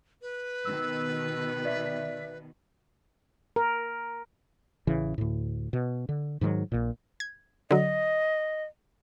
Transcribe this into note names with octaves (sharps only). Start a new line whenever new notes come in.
B4
B2 D#3 B3 E6
D5 E5 B6
A#4
A1 C#3 E3
D2 A2
B2
D3
G#2 D#3 E3 F#3
A#1 A#2
G#6
D3 F#3 D#5